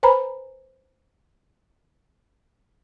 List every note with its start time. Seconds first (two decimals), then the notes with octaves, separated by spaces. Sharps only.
0.03 B4 C5 G#5 A#5 B5